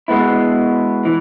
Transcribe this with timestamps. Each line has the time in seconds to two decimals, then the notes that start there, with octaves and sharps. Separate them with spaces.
0.08 B2 G#3 B3 E4
1.05 E3